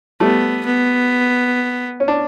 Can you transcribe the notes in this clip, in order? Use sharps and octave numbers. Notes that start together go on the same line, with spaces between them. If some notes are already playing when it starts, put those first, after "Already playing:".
G3 A3 B3
B3
C#4
D4